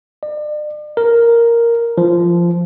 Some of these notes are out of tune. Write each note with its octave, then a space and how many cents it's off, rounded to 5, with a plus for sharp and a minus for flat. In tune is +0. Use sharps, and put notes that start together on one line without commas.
D5 +40
A#4 +0
F3 -15